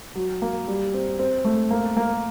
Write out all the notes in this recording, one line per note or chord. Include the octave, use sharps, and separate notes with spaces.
F#3
A#3
G3
C4
C4
A3
A#3
A#3